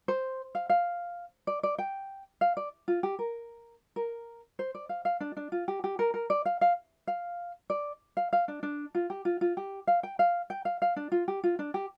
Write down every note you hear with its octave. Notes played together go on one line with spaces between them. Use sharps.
C5
F5
F5
D5
D5
G5
F5
D5
F4
G4
A#4
A#4
C5
D5
F5
F5
D4
D4
F4
G4
G4
A#4
A#4
D5
F5
F5
F5
D5
F5
F5
D4
D4
F4
G4
F4
F4
G4
F5
G5
F5
G5
F5
F5
D4
F4
G4
F4
D4
G4